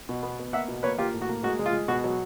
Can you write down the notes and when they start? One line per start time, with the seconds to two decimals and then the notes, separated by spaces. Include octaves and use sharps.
0.09 B2
0.23 B3
0.39 B3
0.53 A#3 E5 F#5
0.68 B2
0.83 A#3 B4 C#5
0.98 A#3 F4 G4
1.14 A2
1.22 F#4
1.29 A#3
1.43 G#3 F#4
1.59 G#3
1.66 F4
1.73 G#3
1.88 B2 F#4
2.04 F#3